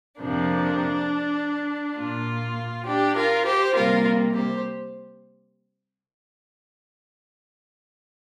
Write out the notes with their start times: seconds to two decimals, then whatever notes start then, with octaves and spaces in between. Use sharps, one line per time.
0.20 F2 C3 F3 A#3 D4
1.97 A#2 A#3 F4
2.85 D4 G4
3.15 F4 A#4
3.45 G4 C5
3.75 C3 G3 A#3 F4 A#4
4.34 G4 C5